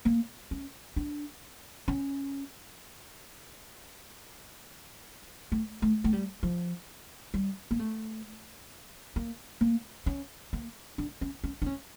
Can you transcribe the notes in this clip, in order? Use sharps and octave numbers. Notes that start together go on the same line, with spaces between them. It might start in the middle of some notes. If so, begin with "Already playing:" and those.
A#3
C#4
D4
C#4
A3
A3
A3
G3
F3
G3
A#3
A3
A#3
A#3
C#4
A#3
D4
C#4
C#4
D4
C#4